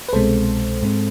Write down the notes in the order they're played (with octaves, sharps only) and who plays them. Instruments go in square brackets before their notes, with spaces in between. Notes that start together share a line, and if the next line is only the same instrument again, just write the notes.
[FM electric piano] B4
C2 B2 G#3 C4 A4 C5
G#2 G#3 C4